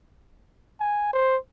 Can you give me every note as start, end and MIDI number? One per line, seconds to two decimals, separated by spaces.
0.80 1.12 80
1.13 1.37 72